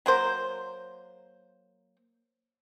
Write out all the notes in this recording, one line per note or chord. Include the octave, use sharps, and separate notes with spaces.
F#3 A#3 C5